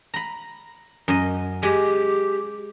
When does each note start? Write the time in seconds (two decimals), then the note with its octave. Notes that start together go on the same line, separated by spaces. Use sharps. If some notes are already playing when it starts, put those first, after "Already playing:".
0.14 A#5 B5
1.08 F#2 D#5
1.63 G#3 G4